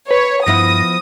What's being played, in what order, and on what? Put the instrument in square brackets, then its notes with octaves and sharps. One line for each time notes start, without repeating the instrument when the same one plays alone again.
[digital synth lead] B4 [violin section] C#5
[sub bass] G2 [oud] F3 B3 E4 [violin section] D#6 [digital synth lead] A#6